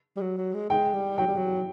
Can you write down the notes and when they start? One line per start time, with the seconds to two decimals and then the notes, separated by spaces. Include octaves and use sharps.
0.17 G3
0.21 F#3
0.37 F#3
0.54 G#3
0.70 G#3 G5
0.94 G3
1.18 F#3 G5
1.27 G3
1.37 F#3